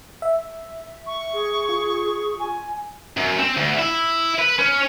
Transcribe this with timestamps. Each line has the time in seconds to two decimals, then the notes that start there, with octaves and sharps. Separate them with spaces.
0.22 E5
1.07 C#6
1.33 G#4
1.69 F4
2.39 G#5
3.17 F#2
3.39 C4
3.57 D2
3.79 E4
4.39 B4
4.58 C#4